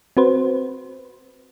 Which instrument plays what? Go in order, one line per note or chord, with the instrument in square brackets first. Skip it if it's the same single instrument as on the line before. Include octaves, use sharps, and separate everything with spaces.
[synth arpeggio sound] C4 F#4 B4 C5